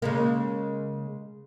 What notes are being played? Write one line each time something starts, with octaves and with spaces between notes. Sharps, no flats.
C#3 G#3 A#3